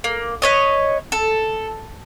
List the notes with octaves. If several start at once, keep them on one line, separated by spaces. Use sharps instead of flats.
A#3
B4 C#5 D#5
A4